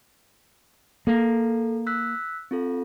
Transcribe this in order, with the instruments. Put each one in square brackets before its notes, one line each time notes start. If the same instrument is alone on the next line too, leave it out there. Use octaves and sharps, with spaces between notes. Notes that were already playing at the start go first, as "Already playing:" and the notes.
[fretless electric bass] A#3 [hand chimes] A4
[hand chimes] E6 F#6 B6
C4 F4 A4